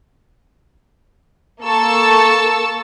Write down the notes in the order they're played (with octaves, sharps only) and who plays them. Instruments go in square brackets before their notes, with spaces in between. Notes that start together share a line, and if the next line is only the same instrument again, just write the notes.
[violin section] A#3 A4 A5 C#6 E6